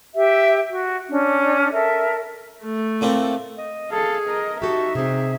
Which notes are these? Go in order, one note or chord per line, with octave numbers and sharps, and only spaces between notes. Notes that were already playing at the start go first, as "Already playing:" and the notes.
G4 E5
F#4
C#4 D4
A4 A#4 E5
A3
A2 A#3 C4
D#5
G#4 A4 F5
A#4 D#5
D#4 F#4 G4 A4 E5
C3 C4 G#4